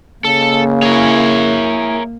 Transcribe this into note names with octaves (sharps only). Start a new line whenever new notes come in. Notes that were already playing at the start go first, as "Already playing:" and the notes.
C#3 A#3 A4
E4 G#4 A#4 C#5